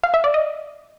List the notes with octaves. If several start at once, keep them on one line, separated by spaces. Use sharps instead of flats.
F5
E5
D5
D#5